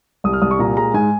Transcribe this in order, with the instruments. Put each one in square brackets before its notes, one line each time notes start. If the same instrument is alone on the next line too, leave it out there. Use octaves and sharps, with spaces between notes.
[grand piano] C2 D#6
F6
C2 D#6
C#6
A#2 A#5
G#3 A#5
G#2 G#5